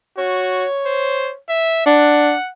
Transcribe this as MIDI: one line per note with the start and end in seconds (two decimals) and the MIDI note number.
0.18 0.66 66
0.18 1.37 73
0.86 1.32 72
1.49 1.84 76
1.86 2.34 62
1.86 2.51 78